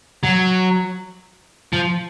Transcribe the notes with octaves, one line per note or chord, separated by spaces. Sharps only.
F#3
F3